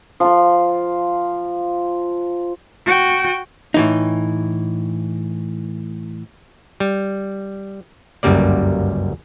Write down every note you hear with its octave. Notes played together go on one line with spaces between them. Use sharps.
F3 F4
F#4 G5
A2 E3 D#4
G3
G1 C#2 F#2 G3 A#3 D5